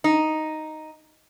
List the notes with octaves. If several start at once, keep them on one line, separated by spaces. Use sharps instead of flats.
D#4